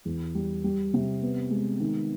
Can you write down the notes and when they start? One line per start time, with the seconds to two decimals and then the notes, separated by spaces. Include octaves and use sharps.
0.05 E2
0.35 G3
0.64 G3
0.94 C3
1.22 B3
1.51 G#3
1.80 D#3